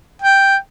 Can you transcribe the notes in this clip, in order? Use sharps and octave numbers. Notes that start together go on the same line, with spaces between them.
G5